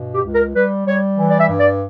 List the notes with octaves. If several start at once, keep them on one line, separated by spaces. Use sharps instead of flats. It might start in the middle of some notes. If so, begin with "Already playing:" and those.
Already playing: G2 B2
G4
C#2
A#4
G3 B4
G3 C#5
E3
D5
E5
G2
D5